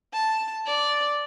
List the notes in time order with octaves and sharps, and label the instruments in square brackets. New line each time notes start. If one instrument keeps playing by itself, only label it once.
[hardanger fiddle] A5
D5